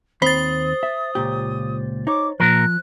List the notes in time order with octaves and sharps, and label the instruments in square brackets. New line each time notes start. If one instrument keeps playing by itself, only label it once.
[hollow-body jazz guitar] D#2 C4 B5 [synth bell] C5 A6 [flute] D#6
[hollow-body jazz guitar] E5
C#2 A#2 G4
[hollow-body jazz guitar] D#4 C#5 [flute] D6
[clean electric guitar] A#2 A#4 [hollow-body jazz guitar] F3 [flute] F#6